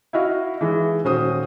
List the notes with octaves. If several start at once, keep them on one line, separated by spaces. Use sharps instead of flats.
E4 F#4 D#5 F5
E3 G#3
D#1 C#4 F#4 C5 D#6